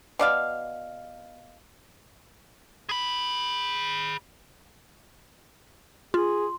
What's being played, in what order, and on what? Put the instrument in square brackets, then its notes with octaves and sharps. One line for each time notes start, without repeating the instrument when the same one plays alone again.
[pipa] B2 D5 F5
[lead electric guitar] G#4 B5
[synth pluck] F4 [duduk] G#4 [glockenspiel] C6